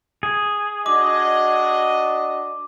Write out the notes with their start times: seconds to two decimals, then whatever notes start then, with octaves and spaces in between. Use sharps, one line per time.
0.23 G#4
0.86 D4 F#4 D#5 D6